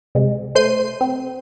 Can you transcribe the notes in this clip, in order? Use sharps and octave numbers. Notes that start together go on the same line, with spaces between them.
C3 G#3
A3 C5 G6 C7 D#7
C4